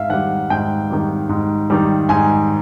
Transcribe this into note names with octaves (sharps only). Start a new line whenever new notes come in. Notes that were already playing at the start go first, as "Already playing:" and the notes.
Already playing: G#2 E5 F5
D#3 G3 F#5
G#2 G5
D#3 G3
G#2
D#3 G3
G#2 G#5